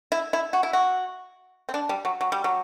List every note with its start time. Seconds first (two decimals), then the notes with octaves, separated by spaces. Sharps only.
0.12 E4
0.33 E4
0.53 F#4
0.63 E4
0.73 F#4
1.69 C4
1.74 D4
1.89 G3
2.05 F#3
2.21 F#3
2.32 G3
2.44 F#3